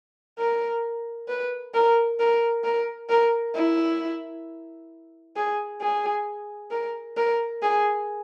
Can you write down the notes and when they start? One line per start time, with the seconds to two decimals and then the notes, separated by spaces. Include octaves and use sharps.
0.38 A#4
1.28 B4
1.74 A#4
2.19 A#4
2.64 A#4
3.09 A#4
3.55 E4
5.36 G#4
5.81 G#4
6.71 A#4
7.17 A#4
7.62 G#4